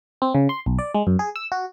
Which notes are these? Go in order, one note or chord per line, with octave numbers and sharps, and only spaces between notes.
C4
C#3
C6
B1
D5
G#3
F#2
G#4
E6
F#4